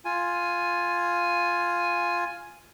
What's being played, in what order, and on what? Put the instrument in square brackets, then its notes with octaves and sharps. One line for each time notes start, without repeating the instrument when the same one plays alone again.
[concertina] F4 G#5